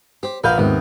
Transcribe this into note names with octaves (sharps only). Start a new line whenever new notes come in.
G4 C5
A#1 F#4 A#4 B4 F5 G6
D#2 G#2 C3 B3